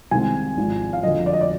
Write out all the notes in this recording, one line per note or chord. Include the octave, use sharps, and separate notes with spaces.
C2 C3 D#3 G#3 C4 G#5
G#1 G#2 F3
F5
G1 F2 D3 D#5
D5
D#5
D5